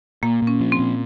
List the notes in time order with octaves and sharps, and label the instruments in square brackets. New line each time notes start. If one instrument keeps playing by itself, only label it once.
[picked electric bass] A#2 [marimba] A#3
[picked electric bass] A#2
[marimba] C#4
[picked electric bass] F3
[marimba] C4
[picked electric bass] A#2